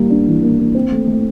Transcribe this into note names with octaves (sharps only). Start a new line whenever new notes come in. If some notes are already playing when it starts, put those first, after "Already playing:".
Already playing: G3 A#3
D4
E3
A#3
A#3
C4
A3
A3